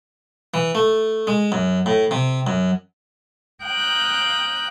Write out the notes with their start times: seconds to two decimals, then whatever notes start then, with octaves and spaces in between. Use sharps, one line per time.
0.54 E3
0.75 A3
1.27 G#3
1.52 F#2
1.86 A2
2.11 C3
2.47 F#2
3.64 F5 G5 A#5 D#6 F#6 G6